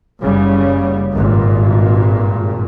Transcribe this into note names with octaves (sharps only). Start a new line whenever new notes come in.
F#1 C#3 G3
G#1 G2 A#2